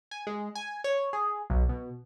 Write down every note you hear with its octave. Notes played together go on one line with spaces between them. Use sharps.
G#5
G#3
G#5
C#5
G#4
B1
B2